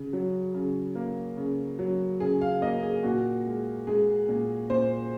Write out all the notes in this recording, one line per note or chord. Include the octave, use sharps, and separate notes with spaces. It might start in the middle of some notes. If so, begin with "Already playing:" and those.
Already playing: C#3
F#3
C#3
A#3
C#3
F#3
C#3 G#4
F5
A#3 D#5
G#4
A#2 F#4
G#3
G#3 G#4
A#2
A#2 C5